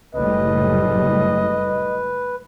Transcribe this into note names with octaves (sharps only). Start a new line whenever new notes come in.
F#1 A2 G3 B4 D#5